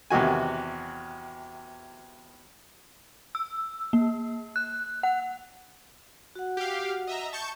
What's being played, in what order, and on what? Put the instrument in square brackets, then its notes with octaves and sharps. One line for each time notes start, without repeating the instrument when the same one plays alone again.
[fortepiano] E2 C3 D#3 F#4 G#5
[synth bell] E6
A#3
F#6
F#5
[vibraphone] F#4 F#5
[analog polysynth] G4 F5
D#5 E5 A#5
A5 C#6 G6